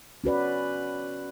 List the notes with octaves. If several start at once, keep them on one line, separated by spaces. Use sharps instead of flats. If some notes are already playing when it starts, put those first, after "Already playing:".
C#4 F#4 B4 D5